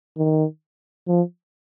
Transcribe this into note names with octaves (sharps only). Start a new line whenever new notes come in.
D#3
F3